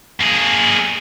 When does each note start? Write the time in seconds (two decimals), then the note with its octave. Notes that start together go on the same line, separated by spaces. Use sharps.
0.20 A#3 G#4